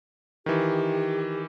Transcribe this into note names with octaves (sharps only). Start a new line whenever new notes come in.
D#3 E3 G4